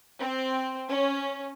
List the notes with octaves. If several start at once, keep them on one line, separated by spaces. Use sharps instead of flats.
C4
C#4